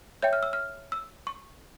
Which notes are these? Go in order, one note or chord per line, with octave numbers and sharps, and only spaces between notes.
C#5 E5 G5 G6
F6
E6
F6
E6
C#6